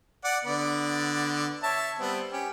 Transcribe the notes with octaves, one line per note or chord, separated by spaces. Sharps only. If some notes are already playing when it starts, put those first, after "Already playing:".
D5 F#5 D6
D3 B3 D5
C#5 E5 A5
G3 B3 C4
C#4 G4